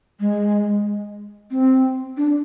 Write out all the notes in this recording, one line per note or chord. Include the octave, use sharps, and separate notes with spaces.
G#3
C4
D4